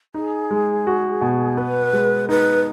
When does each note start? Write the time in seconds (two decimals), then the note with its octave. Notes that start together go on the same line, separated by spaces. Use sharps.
0.14 D#4 G#4
0.51 G#3
0.87 F#4
1.21 B2
1.57 B3 B4
1.93 G#3
2.29 D#4 B4